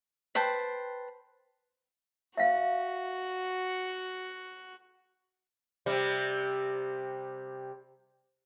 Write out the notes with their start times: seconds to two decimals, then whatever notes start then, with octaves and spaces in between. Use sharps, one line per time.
0.35 B4 C5 G5 A5
2.37 F#4 E5 F5
5.86 C3 G3